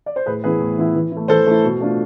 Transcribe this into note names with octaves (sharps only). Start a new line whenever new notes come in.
D5
C5
A2 G#4 B4
E3 B3 E4 G#4 B4
A2
E3 B3 E4
E3
E4
A3
E3 A4 C5
A3 E4
B2
A3 D4 F4